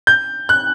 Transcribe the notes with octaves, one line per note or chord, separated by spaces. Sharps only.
G6
F#6